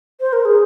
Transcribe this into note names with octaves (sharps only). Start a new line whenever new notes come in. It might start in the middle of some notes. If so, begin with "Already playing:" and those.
C5
A#4
G#4